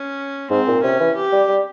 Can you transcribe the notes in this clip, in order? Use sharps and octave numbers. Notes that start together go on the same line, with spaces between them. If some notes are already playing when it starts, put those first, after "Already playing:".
Already playing: C#4
G#2 C4
A#2
C3 C#4
E3
G4
G3
G3